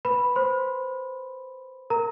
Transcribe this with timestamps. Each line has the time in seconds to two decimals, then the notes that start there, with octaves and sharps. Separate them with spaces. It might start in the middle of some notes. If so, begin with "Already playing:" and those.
0.05 B4 B5
0.36 C5 C6
1.90 A#4 A#5